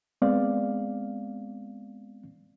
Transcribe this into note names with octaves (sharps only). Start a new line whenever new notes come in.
G#3 B3 C4 D5 F5